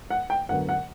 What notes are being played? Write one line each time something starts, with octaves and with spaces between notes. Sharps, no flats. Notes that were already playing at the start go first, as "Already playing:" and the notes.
F#5
G5
F#2 D3 F#3 B3 F#5
F#5